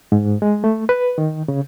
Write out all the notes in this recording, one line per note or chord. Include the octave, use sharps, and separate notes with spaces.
G#2
G#3
A3
B4
D#3
C#3